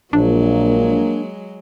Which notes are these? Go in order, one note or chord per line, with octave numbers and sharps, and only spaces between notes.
A#1 F#3 G#3 A#3 D4